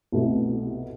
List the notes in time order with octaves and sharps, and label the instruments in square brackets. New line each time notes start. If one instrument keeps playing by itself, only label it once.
[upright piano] C2 B2 A3